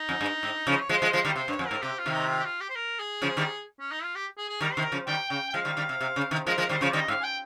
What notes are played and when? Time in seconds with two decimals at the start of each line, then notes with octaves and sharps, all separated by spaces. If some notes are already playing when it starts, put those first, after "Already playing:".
Already playing: D#4
0.09 F2
0.21 G2
0.43 G#2
0.67 C#3 F3
0.80 C#5
0.89 F3 G#3 C5
1.02 F3 G#3
1.13 F3 G#3 C5
1.25 D#3 G3
1.36 C3 C5
1.48 G2
1.52 C#5
1.59 F2
1.67 G#2 A#4
1.82 C3 G4
1.98 F4
2.06 C3 D#3
2.13 D#4
2.29 F4
2.39 G4
2.44 F4
2.60 G4
2.69 C5
2.75 A#4
2.99 G#4
3.22 C#3 F3
3.37 D#3 G3
3.80 C#4
3.91 D#4
4.03 F4
4.15 G4
4.37 G#4
4.49 G#4
4.60 D#3 G3 A#4
4.73 C3 D#3 C5
4.84 A#4
4.92 C#3 F3
5.07 D#3 G3 G5
5.30 C#3 G5
5.49 G5
5.53 F3 G#3 F5
5.65 D#3 G3
5.77 D#3 G3
5.89 C3
6.01 C3
6.16 C#3
6.31 C3 D#3
6.47 F3 G#3 A#4
6.58 F3 G#3 A#4
6.69 D#3 G3 C5
6.81 C#3 F3 C#5
6.93 D#3 G3 D#5
7.08 G#2 F5
7.21 G#5
7.24 G5